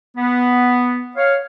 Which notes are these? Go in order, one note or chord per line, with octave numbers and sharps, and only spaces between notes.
B3
C#5 F5